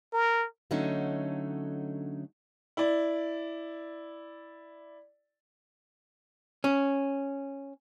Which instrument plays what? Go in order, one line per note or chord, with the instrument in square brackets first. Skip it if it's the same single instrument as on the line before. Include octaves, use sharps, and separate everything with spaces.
[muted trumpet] A#4
[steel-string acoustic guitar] D3 F#3 A3 C#4 D#4
[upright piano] E4 D5
[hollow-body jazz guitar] C#4